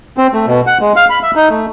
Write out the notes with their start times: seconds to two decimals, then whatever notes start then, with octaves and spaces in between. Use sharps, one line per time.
0.17 C4
0.34 A3
0.47 B2
0.67 F#5
0.81 G#3
0.96 F5
1.10 B5
1.22 E5
1.36 D#4
1.49 A3